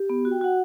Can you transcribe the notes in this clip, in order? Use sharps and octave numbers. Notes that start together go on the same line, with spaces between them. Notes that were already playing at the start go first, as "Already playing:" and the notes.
Already playing: G4
B3
F#4
G5
F#4 F#5